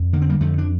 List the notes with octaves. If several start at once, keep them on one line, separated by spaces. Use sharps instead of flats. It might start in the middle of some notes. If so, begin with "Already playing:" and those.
Already playing: F2
D3 A#3
C4
G3 A#3
F2 F3 A3
D4